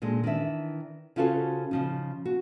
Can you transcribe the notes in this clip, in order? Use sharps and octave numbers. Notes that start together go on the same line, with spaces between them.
A#2 D3 G#3
D#3 E3 D4 E5
C#3 C#4 F4 F#4 A4 C5
C#3 F3 D#4
F#4